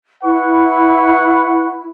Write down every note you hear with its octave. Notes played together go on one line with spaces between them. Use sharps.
E4 B4 F#5 C#6